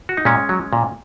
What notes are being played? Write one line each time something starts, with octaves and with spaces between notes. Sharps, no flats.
F#4
D#4
A#2 G#3 C#4
F#3
A#2